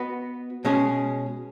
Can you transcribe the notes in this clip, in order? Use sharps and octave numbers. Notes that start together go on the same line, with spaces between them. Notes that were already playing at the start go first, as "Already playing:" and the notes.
Already playing: B3 F#4 B4 D#5
B2 G#3 C#4 G#4